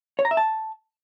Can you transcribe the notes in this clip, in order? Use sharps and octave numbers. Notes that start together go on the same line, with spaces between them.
C#5
A#5
E5
A5